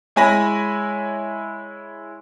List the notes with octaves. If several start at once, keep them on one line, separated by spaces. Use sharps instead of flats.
G#3 E4 C#5 G#5 B5 A#6